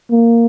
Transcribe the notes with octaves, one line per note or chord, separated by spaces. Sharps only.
A#3